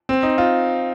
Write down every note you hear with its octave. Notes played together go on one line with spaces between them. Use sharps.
C4
D#4
F4